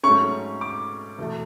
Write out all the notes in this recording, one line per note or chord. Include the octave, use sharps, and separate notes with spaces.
G#2 F#3 A3 C#4 C#6
D6
E2 B2 A3